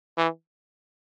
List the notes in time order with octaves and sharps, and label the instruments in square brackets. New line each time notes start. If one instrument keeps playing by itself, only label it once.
[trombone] E3